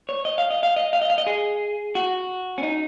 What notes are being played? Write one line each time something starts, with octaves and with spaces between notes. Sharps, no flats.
C#5
D#5
F5
D#5
F5
D#5
F5
D#5
F5
D#5
G#4
F#4
C#4
D#4